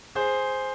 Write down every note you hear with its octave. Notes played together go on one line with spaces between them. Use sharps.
G#4 C5